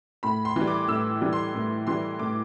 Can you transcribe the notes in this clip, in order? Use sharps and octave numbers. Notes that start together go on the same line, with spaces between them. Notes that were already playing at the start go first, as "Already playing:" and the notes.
A2 B5
C6
E3 G3
D6
A2 E6
E3 G3
C6
A2
E3 G3 C6
A2 D6